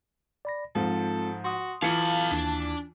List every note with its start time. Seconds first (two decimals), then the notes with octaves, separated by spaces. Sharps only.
0.45 D5 B5 A#6
0.75 G#2 F3 G#3 C4 F4 A4
1.44 F#4 C6 D#6
1.82 E3 F4 A4 F5 A5 C#7
2.32 D#2 D4